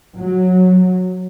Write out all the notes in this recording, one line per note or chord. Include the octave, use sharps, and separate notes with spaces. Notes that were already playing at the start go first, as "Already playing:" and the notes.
F#3